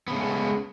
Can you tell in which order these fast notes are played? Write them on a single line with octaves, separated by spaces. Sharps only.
B3 C#3 A3 G#3